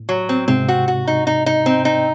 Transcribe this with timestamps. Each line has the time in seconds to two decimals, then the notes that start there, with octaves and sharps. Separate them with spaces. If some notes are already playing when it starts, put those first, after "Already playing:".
Already playing: A2
0.09 F#3
0.29 C4
0.48 G#2 C3 C4
0.68 F#4
0.88 F#4
1.07 D#4
1.27 D#4
1.46 D#4
1.66 C4
1.85 D#4